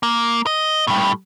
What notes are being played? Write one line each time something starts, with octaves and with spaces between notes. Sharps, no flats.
A#3
D#5
A2 G3